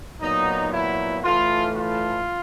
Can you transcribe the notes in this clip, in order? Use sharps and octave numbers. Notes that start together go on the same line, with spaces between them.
A#2 F#3 B3 D#4
E4
A2 E3 A3 F4
F4